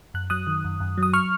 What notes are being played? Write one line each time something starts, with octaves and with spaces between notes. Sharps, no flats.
F#2 F#6
F#3 D#6 F#6
D#3
F#2
F#2
F#3
D#6
C#6 F6